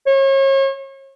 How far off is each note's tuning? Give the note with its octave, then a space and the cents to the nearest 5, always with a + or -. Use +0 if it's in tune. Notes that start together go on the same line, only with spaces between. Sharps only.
C#5 -35